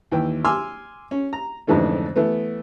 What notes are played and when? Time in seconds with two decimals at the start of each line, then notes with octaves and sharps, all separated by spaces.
0.12 D#2 E3 G5
0.45 G#5 C6 D6 E6 F6
1.11 C#4
1.33 A#5
1.67 F2 G#2 D3 E3 A3 C#4
2.16 E3 A3 B3